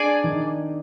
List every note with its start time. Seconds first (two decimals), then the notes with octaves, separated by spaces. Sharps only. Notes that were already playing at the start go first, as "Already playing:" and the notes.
Already playing: D4 G#4 D5 G#5
0.24 D#3 D#4